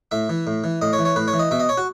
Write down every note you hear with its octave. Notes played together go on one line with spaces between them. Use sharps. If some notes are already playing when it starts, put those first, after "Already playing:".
A2 E5
E3
A2
E3
A2 D#5
C#5
E3
C#5
A2 B4
C#5
E3
D#5
B2 E5
D#5
C#5
F#4